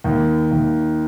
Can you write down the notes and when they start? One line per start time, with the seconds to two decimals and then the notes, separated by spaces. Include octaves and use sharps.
0.04 D#2
0.51 D#2